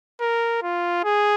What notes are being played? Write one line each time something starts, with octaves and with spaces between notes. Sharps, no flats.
A#4
F4
G#4